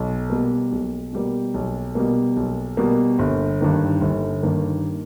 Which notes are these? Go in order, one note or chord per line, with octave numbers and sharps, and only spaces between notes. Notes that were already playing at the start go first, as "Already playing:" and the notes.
Already playing: B1
B2 G3 A#3
B1
B2 G3 A#3
B1
B2 G3 A#3
B1
B2 G3 A#3
G1
G2 D#3 A#3
G1
G2 D#3 A#3